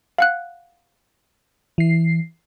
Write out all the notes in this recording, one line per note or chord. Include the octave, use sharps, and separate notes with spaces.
F5 F#5 F#6
E3 C7